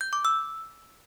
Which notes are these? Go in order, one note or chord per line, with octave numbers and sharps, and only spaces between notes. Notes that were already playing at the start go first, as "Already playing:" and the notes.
G6
D6
E6